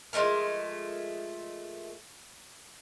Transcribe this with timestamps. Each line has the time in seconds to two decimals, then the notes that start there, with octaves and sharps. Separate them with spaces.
0.13 F3 G#3 A3 A#4